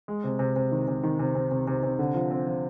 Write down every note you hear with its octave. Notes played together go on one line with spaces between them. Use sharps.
G#3
C3
C3
C3
D#3
C3
D#3
C3
C3
C3
C3
C3
D3
F3
C4
F3